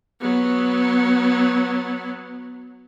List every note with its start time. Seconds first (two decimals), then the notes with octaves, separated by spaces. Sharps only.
0.21 F#3 B3